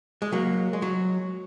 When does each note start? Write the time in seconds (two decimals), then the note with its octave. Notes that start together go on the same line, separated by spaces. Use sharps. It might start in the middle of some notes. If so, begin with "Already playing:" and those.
0.22 G#3
0.32 F#3 A#3
0.73 G#3
0.82 F#3